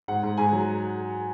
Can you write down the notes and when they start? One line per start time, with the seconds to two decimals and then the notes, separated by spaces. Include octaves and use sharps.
0.08 G#2 F#5
0.23 G#2
0.37 G#2 G#5
0.53 F#3